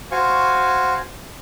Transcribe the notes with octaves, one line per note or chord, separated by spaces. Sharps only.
F#4 C5 F5 G#5 C#6